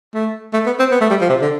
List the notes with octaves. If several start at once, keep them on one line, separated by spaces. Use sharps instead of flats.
A3
A3
B3
C4
B3
A3
G3
F3
C3
D3